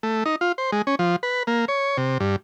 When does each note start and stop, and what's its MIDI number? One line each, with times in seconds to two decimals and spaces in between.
0.03 0.24 57
0.26 0.36 63
0.41 0.52 65
0.58 0.71 72
0.72 0.82 56
0.87 0.95 61
0.99 1.16 53
1.23 1.43 71
1.47 1.65 58
1.68 1.97 73
1.97 2.18 48
2.20 2.36 43